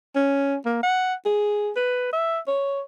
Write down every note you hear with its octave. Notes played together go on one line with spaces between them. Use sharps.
C#4
A#3
F#5
G#4
B4
E5
C#5